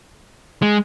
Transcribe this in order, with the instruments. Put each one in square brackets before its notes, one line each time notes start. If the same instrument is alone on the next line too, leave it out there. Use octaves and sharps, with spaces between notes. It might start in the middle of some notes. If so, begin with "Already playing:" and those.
[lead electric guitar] G#3